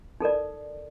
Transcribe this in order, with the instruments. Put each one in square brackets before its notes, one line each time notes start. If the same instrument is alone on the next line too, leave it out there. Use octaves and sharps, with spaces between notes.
[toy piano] D#4 A4 A#4 D5